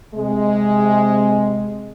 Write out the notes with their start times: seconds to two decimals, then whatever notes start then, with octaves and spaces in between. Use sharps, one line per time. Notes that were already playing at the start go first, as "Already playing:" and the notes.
0.14 C3 G#3